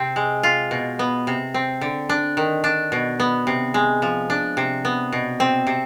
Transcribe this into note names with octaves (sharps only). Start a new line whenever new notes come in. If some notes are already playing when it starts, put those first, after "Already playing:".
Already playing: C3 C4
G#3
F4
B2
B3
C3
C4
D3
D4
D#3
D4
B2
B3
C3
G#3
F3
D4
C3
B3
B2
C4
C3